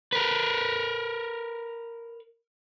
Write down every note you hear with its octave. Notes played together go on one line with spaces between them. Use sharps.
A#4 B4